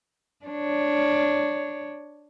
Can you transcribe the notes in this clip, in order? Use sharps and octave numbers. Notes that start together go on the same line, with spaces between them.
D4 C#5